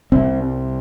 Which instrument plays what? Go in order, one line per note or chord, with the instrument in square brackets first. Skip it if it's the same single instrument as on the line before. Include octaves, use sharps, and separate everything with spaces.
[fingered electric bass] C2 C3 C4